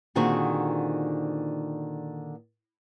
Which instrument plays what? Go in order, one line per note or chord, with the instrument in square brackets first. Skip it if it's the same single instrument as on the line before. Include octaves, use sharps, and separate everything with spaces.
[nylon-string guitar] A#2 D3 D#3 C4 F#4 G#4